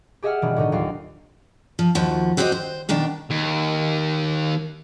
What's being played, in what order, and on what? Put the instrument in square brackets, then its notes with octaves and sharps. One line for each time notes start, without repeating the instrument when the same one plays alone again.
[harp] G4 G#4 D#5 E5 F#5 F6
B2 D#3 E3 G3 D4
A2 D3 D#3 D#4
D#2 F#3 F4 F5
[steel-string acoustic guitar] F3
D#2 F3 F#4
C4 F#4 G4 C5 C#5 D#5
C5
B2 D#3 D4 G5
[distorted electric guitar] D#2